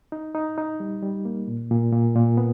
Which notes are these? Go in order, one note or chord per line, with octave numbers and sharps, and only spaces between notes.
D#4
D#4
D#4
G3
G3
A#3
A#2
A#2
A#2
A#2
B3